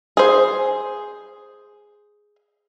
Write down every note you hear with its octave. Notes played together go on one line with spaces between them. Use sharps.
G#4 C5